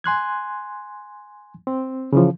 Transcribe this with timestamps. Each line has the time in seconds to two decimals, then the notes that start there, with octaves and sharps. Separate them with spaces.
0.04 G#5 C6 F#6 G#6
1.67 C4
2.13 C#3 E3 F3